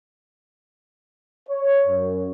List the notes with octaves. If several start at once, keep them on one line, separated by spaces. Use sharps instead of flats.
C#5
F#2